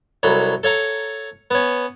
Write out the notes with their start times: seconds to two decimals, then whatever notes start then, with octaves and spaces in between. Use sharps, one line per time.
0.23 C2 F#3 A4 B5
0.63 A4 C#5 F5 A#5
1.51 B3 C#4